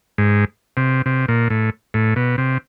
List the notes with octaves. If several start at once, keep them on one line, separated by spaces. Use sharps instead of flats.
G#2
C3
C3
A#2
A2
A2
B2
C3